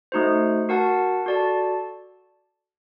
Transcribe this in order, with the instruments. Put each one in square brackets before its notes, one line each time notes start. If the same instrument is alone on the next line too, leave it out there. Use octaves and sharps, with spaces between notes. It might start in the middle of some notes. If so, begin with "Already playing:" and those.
[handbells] A3 D#4 F#4 C5
F#4 A#4 F#5 A5
F#4 A4 D5 A5